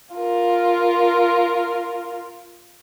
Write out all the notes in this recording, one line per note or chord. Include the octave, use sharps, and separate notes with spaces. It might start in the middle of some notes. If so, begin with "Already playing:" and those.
F4 A#4